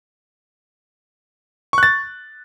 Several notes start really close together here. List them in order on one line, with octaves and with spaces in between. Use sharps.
C#6 F#6 A6